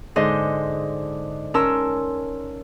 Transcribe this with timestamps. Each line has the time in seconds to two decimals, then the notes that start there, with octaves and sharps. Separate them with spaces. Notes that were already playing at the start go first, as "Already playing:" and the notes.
0.16 G#2 D3 C5 D#5
1.54 C#4 A#4 A5 C6 E6